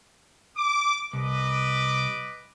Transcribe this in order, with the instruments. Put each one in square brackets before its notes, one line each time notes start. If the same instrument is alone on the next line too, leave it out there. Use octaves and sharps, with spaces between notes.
[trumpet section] D6
[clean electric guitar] C2 [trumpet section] B4 D#5 D6